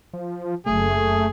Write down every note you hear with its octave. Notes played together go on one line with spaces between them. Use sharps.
F3
F#1 A3 G#4